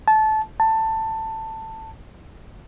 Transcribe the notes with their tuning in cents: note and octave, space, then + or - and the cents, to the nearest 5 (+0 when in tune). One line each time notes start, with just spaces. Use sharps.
A5 -20
A5 +15